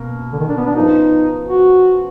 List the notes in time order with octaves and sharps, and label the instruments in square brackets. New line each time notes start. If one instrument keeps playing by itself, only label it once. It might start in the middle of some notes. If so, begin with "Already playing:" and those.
Already playing: [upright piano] B2 A#3 A#4
[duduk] D3
D#3
D4
B3
D4
[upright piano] F3 B3 F4 A#4 [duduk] D#4
[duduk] F#4